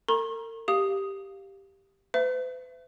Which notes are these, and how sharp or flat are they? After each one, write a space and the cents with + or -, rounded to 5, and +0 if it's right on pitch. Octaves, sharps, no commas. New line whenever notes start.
A#4 -45 A#5 +25 C#6 -40
G4 +0 F5 +0 D#6 +0
B4 +45 E5 +25